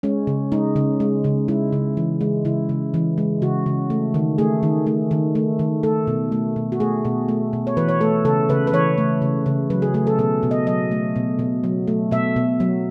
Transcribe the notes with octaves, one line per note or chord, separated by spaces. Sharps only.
G#3 C#4
C#3
G#3 D#4
C#3
G#3
C#3
G#3 E4
C#3
E3
G#3
C#3 E4
C#3
E3
G#3
C#3 F#4
C#3
A3
D#3
A3 G#4
D#3
A3
D#3
A3
D#3
A3 A4
B2
A3
B2
F#4
A3 G#4
B2
A3
B2
C#5
E3 B4
C#5
A3 A4
C#3 A4
C#3 B4
B4
E3 C#5
A3
C#3
C#3
F#3 B4
G#4
A3 G#4
A4
B2 A4
B2
D#5
F#3 D#5
A3
B2
B2
F#3
A3
B2 E5
B2
F#3